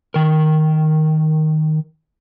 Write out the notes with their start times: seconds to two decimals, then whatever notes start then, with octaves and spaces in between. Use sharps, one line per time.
0.14 D#3 A#4